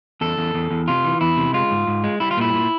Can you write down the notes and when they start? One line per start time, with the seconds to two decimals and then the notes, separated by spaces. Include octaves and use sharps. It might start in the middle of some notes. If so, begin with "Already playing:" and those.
0.21 E2 A4
0.37 E2
0.54 E2
0.71 E2
0.88 C3 F4
1.04 E3
1.21 E2 E4
1.37 C3
1.54 G#3 F4
1.71 G#2
1.87 G#2
2.04 G#3
2.20 G3 E4
2.31 F4
2.37 A#2 E4
2.54 A#2